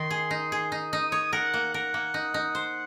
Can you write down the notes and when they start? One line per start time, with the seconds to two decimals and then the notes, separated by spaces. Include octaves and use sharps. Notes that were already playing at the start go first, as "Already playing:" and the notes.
Already playing: D#3 D#4 C6
0.10 G#4
0.31 D#4
0.52 G#4
0.72 D#4
0.92 D#4 D#6
1.12 C#5
1.33 A#4 F#5
1.54 A#3
1.74 A#4 F#5
1.94 A#3
2.14 D#4
2.34 D#4
2.55 C5